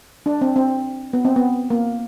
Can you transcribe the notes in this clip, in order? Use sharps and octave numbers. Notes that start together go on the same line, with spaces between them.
D4
C4
C4
B3
C4
B3
A#3